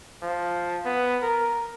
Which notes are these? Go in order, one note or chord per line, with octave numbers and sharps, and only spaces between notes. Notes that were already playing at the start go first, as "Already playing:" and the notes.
F3
B3
A#4